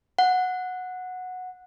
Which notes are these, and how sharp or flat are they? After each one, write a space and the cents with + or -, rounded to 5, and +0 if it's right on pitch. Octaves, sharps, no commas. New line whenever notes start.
F#5 -10